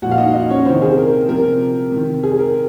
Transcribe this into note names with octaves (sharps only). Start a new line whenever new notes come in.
A#2 F3 F#4 F#5
F5
D#4 D#5
D#4 D#5
C#4 C#5
C3 D#3 C4 C5
G#4
A#4
C3 F3 A#4
C3
D#3
G#4
A#4